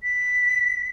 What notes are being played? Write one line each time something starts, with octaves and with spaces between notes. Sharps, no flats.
B6